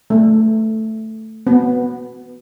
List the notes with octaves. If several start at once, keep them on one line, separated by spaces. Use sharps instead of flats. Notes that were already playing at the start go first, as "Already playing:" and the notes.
A3
B3